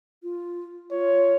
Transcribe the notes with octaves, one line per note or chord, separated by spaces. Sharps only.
F4
F4 C#5